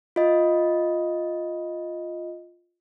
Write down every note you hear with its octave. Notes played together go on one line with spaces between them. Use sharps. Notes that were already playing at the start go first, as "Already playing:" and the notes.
F4 D#5